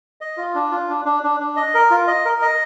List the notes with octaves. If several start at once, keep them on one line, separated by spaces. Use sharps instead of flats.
D#5
F4
D4
F4
D4
D4
D4
D4
D#5
A#4
F4
D#5
A#4
D#5